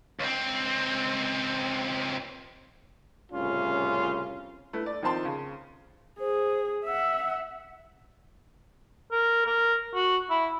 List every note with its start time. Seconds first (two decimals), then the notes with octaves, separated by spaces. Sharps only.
0.19 C#2 C4
3.32 C2 A2 C#3 C#4 F4
4.73 A3 E4 B4
4.86 D5
5.02 D#3 F3 C4 A5 C6
5.25 C#3
6.19 G#4 C5
6.86 E5 F#5 E6
9.12 A#4
9.47 A#4
9.95 F#4
10.30 E4